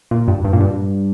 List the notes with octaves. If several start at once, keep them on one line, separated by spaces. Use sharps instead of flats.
A#2
G2
G2
A#2
G2